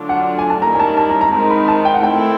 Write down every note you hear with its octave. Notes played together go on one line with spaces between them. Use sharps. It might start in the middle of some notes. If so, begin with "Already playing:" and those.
Already playing: D3 F#3 A3 D4 F4
F#5
G#5
A5
D#3 G3 A#3 C#4 E4 A#5
G#5
A5
A5
A#5
A#5
D#3 G#3 C4 D#4 A#5
B5
A5
G5
F#5
A3 C4 E4 G5